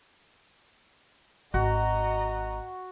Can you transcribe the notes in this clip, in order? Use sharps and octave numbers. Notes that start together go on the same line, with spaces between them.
G#1 F#4 D#5 A#5